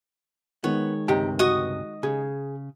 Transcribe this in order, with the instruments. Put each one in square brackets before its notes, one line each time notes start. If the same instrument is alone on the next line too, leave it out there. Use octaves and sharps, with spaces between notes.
[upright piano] D#3 G#3 [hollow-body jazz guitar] B3 [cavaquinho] C#5
[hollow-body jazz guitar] C#2 G2 C3 [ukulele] D#4 G4 G5
[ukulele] F#4 [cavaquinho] D#5 C#6 D#6
[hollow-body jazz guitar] C#3 [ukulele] G#4